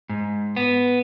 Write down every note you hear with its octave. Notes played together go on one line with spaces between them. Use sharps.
G#2
B3